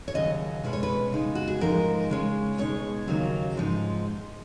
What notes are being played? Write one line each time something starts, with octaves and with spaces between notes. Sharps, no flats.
C#5
D#2 C#3 F#3 D#5
B2 G#3 C#4 B4
C#5
B4
C#3 G#3 D#4
F#4
G#4
G#2 F3 G#3 D#4 A#4
C#3 G#3 C#4
B2 G#3 D#4 C#5
D#2 C#3 F#3 A#3 D#4
G#2 F3 G#3 D#4